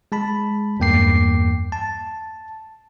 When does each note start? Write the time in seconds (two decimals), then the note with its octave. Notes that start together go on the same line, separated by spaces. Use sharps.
0.12 G#3 A5 B5
0.80 E2 G2 A#3 G5 D6 C7
1.72 A5